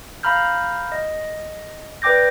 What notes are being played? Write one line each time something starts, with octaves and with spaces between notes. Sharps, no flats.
F5 A#5 B5 F6 G6
D#5
B4 D5 G5 D6 G6 A#6